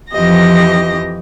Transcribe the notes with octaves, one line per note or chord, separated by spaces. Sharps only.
F2 E3 F3 G4 D#5 A#6